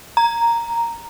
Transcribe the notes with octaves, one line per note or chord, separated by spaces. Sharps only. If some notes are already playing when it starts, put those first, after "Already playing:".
A#5